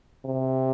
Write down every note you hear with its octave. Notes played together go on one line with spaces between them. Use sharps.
C3